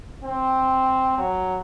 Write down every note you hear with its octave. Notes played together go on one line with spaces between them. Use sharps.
C4
F#3